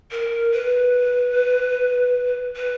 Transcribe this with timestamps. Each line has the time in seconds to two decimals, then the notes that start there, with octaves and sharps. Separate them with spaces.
0.11 A#4
0.52 B4
2.56 B4